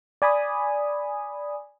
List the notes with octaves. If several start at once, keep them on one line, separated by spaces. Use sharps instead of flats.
D5 G#5 B5 D#6